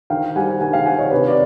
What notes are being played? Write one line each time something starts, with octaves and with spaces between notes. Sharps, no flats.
D#3 F5 G5
G3 F#5 G#5
D#3 F#5 G#5
F5 G5
D#3 F#5 G#5
C#5 D#5
C3 B4 C#5
D5